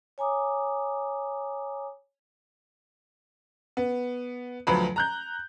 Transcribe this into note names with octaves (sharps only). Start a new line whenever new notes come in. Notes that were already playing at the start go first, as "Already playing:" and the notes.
C#5 G#5 A#5 D6 D#6
B3
D2 F3 F#3 B4 B5
A#5 F#6 G6